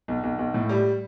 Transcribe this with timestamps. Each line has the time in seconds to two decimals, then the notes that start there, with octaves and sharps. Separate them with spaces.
0.08 B1
0.23 B1
0.39 B1
0.54 A2
0.69 G3